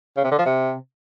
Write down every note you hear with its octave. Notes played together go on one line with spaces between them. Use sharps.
C#3
C3
D3
F3
C3